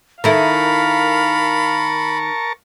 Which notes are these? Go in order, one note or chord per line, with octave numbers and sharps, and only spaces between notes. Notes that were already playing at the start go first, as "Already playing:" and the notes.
D#3 E4 A4 A#4 F5 A5 B5 C#6